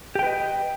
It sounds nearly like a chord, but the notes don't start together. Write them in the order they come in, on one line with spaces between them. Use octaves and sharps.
G4 G5 B4 D#5